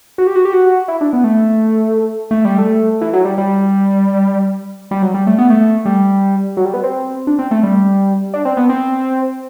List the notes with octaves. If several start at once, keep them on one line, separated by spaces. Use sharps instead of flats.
F#4
G4
F#4
G4
F#4
E4
D4
B3
A3
A3
G3
A3
E3
F#3
G3
G3
G3
F#3
G3
A3
B3
A3
G3
F#3
G3
B3
C4
D4
C4
A3
G3
D4
C4
B3
C4